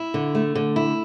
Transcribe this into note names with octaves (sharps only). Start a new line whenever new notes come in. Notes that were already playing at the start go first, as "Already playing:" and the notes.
Already playing: E4
D3
A3
D3
E4